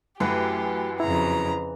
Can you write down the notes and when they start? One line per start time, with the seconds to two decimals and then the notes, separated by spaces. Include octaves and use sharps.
0.20 F#2 E3 F#3 A3 G4 B4
1.00 F2 C#3 E4 A#5